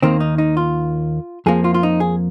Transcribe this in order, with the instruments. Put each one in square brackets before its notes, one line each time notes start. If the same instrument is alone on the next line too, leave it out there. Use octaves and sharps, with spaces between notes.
[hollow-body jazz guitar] D#2 D#3 A#3 C4
D#4
D#4
F4
F2 F3 A#3 G#4
F4
F4
D#4
G#4